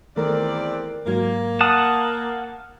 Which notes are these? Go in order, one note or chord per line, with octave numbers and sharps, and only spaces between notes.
E2 D#3 A3 C4 A#4 D5
G#2 F#3 A#3 G#6
F#5 A5 D#6 F6